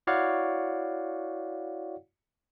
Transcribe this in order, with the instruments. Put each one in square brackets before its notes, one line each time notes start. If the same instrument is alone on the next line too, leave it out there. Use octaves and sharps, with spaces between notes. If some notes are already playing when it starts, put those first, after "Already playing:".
[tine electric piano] E4 F#4 C#5 D5 F5 F#5